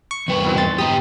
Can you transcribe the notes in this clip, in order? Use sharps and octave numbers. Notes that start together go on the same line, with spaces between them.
C#6 C#7
E2 G3 B4
B2 E3 C4
C6 A6
B3 G4 A#5 D#6